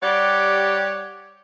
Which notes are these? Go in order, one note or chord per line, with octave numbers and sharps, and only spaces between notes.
G3 G4 C#5 D5 F#5